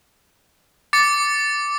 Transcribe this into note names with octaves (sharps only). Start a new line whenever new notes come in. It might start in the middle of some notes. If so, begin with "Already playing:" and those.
D6 A6 C#7